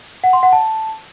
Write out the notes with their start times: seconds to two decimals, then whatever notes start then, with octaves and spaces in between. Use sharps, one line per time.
0.24 F#5
0.33 C6
0.43 F#5
0.53 A5